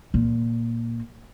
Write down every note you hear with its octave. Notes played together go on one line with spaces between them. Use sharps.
A#2